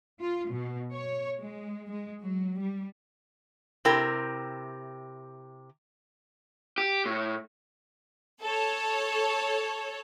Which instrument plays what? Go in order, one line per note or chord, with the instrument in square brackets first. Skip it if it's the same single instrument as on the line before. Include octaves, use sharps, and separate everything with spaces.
[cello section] F4
B2
C#5
G#3
G#3
F#3
G3
[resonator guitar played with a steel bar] C3 E4 G4 A#4 G5
[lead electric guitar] G4
A2
[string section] A4 C#5